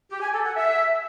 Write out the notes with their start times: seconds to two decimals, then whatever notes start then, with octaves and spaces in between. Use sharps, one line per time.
0.10 G4
0.22 G#5
0.33 A4
0.44 F#5
0.55 E5